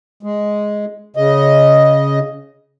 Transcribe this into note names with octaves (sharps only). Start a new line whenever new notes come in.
G#3
C#3 D#5